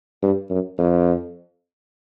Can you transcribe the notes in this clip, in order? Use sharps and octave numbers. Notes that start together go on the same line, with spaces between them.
G2
F#2
F2